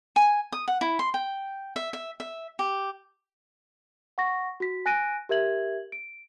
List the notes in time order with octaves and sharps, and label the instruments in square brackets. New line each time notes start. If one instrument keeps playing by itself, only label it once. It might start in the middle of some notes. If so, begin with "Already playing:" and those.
[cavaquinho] G#5
D#6
F#5
E4
C6
G5
E5
E5
E5
G4
[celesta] F#5 C#6 A#6
F#4 B6
G#5 F#6 A#6 D7 D#7
G4 A#4 E5 G#6 F#7
D7